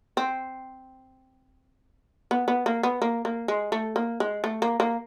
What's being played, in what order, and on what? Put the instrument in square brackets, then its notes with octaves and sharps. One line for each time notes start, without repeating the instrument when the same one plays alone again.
[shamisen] C4
B3
B3
A#3
B3
A#3
A#3
G#3
A3
A#3
G#3
A3
A#3
A#3